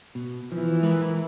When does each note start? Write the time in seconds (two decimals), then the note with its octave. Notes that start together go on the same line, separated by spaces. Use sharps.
0.15 B2
0.52 E3 F3
0.82 G#3 A#4 B4